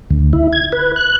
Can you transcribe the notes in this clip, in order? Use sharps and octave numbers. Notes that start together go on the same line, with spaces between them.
D2
E4
G#6
B4
F#6